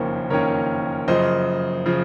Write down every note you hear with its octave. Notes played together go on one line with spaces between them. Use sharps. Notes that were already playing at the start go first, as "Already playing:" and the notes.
Already playing: F#1 F2 D#3 A#3 C#4 C5
F#1 F2 D#3 A#3 C#4 A#4 C#5
F#2 C#3 F3 C5 D#5
C#3 F3